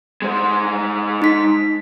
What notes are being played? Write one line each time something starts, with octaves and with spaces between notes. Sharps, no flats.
G#3 C5
D#4 B6